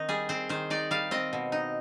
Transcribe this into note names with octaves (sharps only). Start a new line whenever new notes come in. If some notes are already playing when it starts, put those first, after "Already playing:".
Already playing: D#3 C4 D#4
G3 G#4
C4 C5
D#3 C5
D#4 D5
G3 F5
C4 D#5
B2
D#4